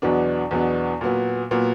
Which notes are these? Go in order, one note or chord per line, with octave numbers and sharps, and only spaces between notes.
E2 B2 F#3 B3 D4
E2 B2 F#3 B3 D4
A#2 F#3 B3
A#2 F#3 B3